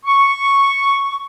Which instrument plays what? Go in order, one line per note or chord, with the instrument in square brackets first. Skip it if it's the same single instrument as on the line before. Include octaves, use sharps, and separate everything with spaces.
[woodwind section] C#6